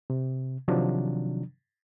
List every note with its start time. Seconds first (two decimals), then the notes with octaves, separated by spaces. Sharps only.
0.10 C3
0.68 C3 D#3 F3 F#3 D4